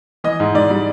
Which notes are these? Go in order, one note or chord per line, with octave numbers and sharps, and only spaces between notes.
E3 D#5
G#2
G#2 D5
G3